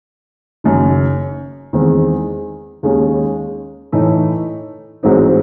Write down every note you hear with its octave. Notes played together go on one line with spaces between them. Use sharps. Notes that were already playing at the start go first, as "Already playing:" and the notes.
F#1 F#2 D#3
E2 D#3 G#3 C4 D#4
D#2 D#3 G#3 C#4
A2 E3 A3 D#4
A1 G#2 F#3 C4 D#4